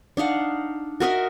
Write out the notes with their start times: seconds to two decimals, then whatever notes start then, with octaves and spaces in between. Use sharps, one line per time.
0.17 D4 D#4 F5 F#5
1.00 F#4 A#4 D#5 E5